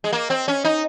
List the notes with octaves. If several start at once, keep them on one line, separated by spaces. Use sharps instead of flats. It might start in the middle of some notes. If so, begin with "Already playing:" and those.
G#3
A#3
C4
C#4
D#4